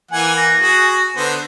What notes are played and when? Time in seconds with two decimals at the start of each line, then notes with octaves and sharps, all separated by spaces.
0.11 E3 A#3 F#5 G#5
0.37 A#6
0.60 F#4 G#4
1.17 D3 B3 C5